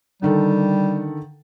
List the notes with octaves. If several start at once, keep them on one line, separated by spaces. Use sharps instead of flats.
D3 D#3 G3 A4